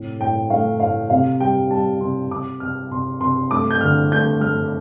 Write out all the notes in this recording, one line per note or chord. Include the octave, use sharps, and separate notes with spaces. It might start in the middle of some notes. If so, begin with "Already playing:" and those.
Already playing: A2 C3
A2 G5
A3 F5
A2 F5
C3 F5
G3 G5
G3 A5
C3 C6
C3 D6
C3 F6
C3 C6
C3 C6
A3 D6
G6
D3 F6
A3 G6
A3 F6